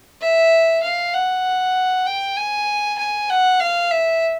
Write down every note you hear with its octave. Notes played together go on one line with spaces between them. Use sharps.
E5
F5
F#5
G5
G#5
G#5
F#5
F5
E5